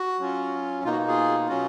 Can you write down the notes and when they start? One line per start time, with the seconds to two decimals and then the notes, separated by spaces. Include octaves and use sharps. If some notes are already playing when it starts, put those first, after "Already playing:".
Already playing: F#4
0.19 F#3 C#4 F4
0.83 B2 A#3 D#4 F4
0.92 F#4
1.08 F4 G#4
1.48 B2 F#3 C#4 F4 F#4